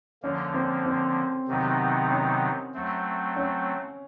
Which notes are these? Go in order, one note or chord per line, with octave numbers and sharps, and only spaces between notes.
D3 F3 A#3 C#4
C4
C4
C3 D#3 F#3 B3 D#4
C#4
F#3 A3 C4
C#4